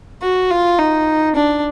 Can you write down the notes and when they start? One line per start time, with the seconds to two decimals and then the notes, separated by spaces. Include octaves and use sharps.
0.22 F#4
0.51 F4
0.78 D#4
1.36 D4